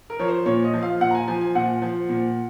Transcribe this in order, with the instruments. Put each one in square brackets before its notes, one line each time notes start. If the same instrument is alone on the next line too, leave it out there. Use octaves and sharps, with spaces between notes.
[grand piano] A#4
F3 C#5
C5
A#2 C#5
D#5
F3
F5
A#2 F#5
A#5
G#5
F3 G#5
G#5
A#2 F#5
F3
A#2